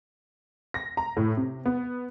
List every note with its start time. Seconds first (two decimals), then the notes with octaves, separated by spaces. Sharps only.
0.74 A#6
0.97 A#5
1.17 A2
1.37 C3
1.65 B3